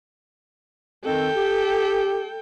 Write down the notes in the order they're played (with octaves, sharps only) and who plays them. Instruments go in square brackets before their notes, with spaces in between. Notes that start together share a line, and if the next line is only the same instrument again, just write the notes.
[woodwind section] D#3 C4 [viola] A4 G5
[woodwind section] G4